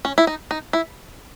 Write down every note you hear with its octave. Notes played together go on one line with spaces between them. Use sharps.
C#4
E4
D#4
D#4
E4